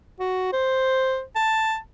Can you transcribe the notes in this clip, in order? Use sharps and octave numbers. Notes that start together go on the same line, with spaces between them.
F#4
C5
A5